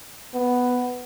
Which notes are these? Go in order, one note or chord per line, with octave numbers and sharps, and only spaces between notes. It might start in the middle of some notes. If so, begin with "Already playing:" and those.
B3